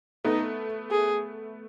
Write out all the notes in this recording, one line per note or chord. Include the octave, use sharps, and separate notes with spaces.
A3 B3 D#4
G#4